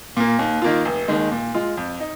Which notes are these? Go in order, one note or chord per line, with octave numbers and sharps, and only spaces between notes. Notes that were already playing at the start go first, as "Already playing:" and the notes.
A#2 A#3
D#2
D#3 A#3 F4
F1
D#2 D#3 G#3
A#2
G#3 F4
F2
D#4